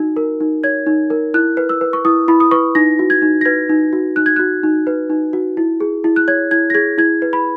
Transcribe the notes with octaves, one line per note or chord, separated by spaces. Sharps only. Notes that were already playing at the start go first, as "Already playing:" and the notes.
Already playing: D#4 F#4
A#4
D#4
C#5 G#6
D#4
A#4
E4 F#6
B4
E6
B4
C#6
E4 D#6
E4 B5
D#6
B4 C#6
D#4 A#6
F#4
G#6
D#4
A#6
B4 G#6
D#4
F#4
D#4 F#6
G#6
F#4 F#6
D#4
B4
D#4
F#4
E4
G#4
E4
F#6
C#5 G#6
E4 G#6
A#6
G#4 G#6
E4 G#6
B4
B5